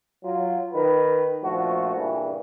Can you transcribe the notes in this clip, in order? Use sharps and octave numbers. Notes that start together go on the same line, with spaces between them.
F#3 F4
D#3 B4
A#1 F3 A3 F#4
G2 A#2 C#3 E3